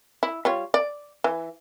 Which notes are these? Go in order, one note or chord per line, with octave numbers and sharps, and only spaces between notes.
E4
G3 F4 C#5
D5
E3